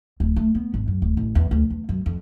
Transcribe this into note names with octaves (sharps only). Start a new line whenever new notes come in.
D1
A3
B3
G#1
F#2
D1
A1
E2
D2
E2
F#2
F2